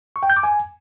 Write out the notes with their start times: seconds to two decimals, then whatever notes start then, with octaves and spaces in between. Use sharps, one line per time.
0.16 C#6
0.23 G5
0.30 G6
0.37 D6
0.43 G#5